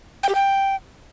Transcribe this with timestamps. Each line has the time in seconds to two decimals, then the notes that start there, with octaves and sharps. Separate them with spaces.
0.23 G5
0.29 G4
0.35 G5